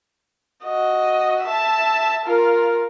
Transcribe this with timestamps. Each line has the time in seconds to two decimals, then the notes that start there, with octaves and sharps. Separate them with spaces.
0.64 F#4 D#5
1.43 E5 A5
2.26 F4 A#4